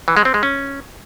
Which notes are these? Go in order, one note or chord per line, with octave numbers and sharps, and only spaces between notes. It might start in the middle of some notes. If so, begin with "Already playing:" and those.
E3
G#3
C4
G#3
C#4